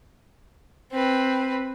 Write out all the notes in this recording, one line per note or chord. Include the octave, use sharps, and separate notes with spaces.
C4 B4